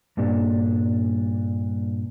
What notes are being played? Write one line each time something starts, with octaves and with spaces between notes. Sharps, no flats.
G2 A#2 G3 D4